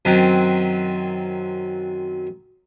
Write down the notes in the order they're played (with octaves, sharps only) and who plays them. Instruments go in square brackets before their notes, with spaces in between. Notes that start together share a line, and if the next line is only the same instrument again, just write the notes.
[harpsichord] F#2 D#3 F#3 C4